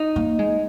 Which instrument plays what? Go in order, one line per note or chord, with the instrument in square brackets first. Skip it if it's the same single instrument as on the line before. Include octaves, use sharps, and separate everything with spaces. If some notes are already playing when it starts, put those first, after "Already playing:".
Already playing: [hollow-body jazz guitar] D#4
[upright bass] A#3
G#3